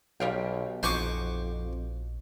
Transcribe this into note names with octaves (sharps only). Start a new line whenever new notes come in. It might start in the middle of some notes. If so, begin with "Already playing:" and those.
B1 G3 F5 G5
A#1 F2 B2 D#4 G#4 C5 C#6 D6